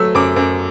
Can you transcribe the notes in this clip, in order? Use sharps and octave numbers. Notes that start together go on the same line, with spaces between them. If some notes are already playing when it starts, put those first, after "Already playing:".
Already playing: F#3 A3 E6
F#2 D6
F#2